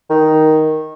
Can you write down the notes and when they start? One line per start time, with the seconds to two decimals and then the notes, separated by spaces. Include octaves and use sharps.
0.10 D#3